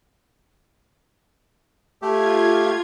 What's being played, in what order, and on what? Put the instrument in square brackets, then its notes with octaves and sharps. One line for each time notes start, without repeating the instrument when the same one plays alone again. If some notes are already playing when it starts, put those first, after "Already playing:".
[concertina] A3 G4 [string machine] F4 G#6